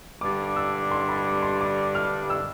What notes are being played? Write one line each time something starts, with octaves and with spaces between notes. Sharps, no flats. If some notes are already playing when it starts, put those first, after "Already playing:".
G2 D3 G3 D4 D6
E6
C6
B5
C6
D6
F6
E6